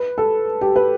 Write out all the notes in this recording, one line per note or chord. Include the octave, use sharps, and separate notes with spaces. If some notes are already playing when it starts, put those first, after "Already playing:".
Already playing: B4
A4
G4
B4